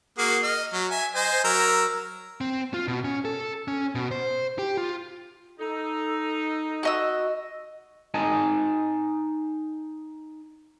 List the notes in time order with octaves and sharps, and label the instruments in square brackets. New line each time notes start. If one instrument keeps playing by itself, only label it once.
[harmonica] A#3 F#4 G#4
D#5 F6
F#3
E5 G#5
C5 D#5 G#5
F#3 A#4 E6
[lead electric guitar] C4
F4
B2
C#4
A4
C#4
B2
C5
G4
F4
[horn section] D#4 [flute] A4
[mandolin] F#4 D#5 E6
[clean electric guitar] D#4 D#5 G#5 A5